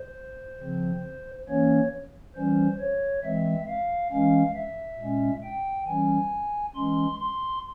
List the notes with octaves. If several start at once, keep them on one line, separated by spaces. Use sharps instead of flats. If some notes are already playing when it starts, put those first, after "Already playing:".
Already playing: C5
C#3 F3 C4
E3 A#3 C#4 C#5
E3 G3 C#4 C5
C#5
E3 G#3 C4 E5
F5
E3 G#3 C#4 F5
E5
A#2 G#3 C#4
G5
E3 G3 C#4 G#5
E3 G#3 C#4 C6
C6